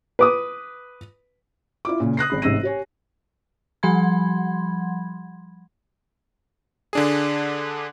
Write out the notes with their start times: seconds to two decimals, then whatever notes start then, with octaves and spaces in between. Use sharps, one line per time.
0.19 B4 D6 D#6
1.85 E4 F4 D6
2.00 A#2 C#3
2.17 D#6 F#6 A#6 C7
2.30 G#1 G#3 B5
2.42 A1 G#2 C3 E6 A#6 D#7
2.63 G4 C#5 G#5
3.83 F3 G3 F#5 B5 C6 G#6
6.93 D3 D4 G#4